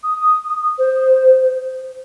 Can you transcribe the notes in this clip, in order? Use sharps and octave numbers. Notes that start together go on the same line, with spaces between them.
D#6
C5